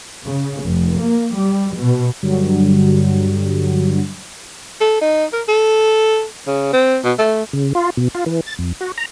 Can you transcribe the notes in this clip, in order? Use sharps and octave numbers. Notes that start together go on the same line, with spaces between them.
C#3
F1
A#3
G3
B2
G2 D3 F#3 G3
A4
D#4
A#4
A4
C#3
C4
B2
A3
C#3
F4
B2
F4
E3
A6
F2
F#4
A#5